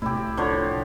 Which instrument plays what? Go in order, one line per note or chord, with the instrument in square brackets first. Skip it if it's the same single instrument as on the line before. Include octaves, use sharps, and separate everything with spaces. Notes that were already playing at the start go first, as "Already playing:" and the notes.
[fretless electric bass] C2 A2 [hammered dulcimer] E4 G4
[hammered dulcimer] D3 F3 C#5